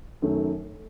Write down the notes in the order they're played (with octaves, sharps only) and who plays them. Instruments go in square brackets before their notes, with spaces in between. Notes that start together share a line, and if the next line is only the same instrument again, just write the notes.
[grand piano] F#2 D#3 A3